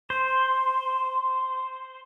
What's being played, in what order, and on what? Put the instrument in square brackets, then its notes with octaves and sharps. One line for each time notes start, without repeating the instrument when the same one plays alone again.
[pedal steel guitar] C5 [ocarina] C6